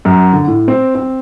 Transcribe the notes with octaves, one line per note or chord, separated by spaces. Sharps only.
F#2
D3
A2
C4
C4